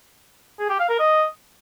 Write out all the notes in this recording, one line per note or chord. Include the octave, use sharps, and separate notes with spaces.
G#4
G4
F5
A#4
D#5